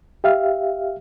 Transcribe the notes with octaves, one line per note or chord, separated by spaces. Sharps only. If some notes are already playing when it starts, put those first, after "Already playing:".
G4 E5 F5 F6